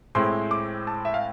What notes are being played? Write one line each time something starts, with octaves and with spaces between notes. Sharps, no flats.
A2 G#3 C4 E4 C6
D6
A5
E5
F5